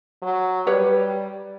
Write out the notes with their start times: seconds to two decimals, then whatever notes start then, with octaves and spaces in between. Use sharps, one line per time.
0.22 F#3
0.67 G3 G4 B4 C#5